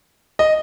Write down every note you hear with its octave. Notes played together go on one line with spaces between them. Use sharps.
D#5